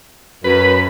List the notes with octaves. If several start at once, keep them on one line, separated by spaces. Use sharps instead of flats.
F#2 B4